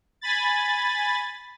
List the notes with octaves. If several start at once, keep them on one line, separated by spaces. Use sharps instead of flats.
G#5 B5 A6